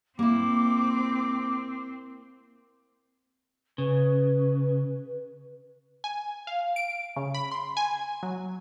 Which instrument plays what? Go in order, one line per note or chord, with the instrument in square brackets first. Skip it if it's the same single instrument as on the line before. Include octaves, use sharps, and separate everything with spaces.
[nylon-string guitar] A#3 E4 [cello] C4 [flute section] D6
[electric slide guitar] C#3 [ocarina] B4
[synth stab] G#5
F5
D7
C#3
B5
C6
G#5
F#3